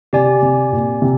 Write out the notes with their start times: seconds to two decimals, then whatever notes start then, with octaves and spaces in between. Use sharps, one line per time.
0.13 C3 G4 D5 G#5
0.42 C3
0.72 A#2
1.02 C3